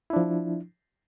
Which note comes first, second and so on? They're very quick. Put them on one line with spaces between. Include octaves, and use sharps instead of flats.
E4 D4 F3